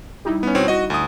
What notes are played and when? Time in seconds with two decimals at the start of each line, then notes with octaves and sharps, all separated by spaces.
0.25 G3 D#4 E4
0.43 B3 C#4
0.55 B2 C4 C#5
0.68 F#4 D#5
0.90 D2 D#6